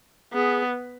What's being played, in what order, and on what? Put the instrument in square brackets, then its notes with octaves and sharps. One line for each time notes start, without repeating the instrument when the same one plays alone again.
[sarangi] B3 [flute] G#4